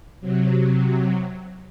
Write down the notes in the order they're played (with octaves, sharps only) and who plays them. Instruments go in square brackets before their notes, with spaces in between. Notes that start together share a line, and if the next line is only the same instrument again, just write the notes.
[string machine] C3 F#3